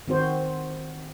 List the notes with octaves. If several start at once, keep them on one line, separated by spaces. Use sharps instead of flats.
D#3 C4 F#4 C5